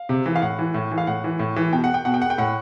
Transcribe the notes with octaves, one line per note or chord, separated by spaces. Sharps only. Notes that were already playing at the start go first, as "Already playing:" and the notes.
Already playing: F5
C3
E3
F5
A2 F#5
E3
A2
E3
F5
A2 F#5
E3
A2
E3
B2 G5
F#5
G5
B2 F#5
G5
F#5
G5
A2 F#5